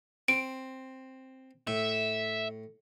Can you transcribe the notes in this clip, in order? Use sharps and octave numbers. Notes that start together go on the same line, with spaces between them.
C4 D7
A2 E5